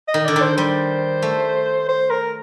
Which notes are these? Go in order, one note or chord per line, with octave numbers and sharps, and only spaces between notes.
D#5
D#3
D3 D5
D#3
C5
G3 C5
A3
C5
A#4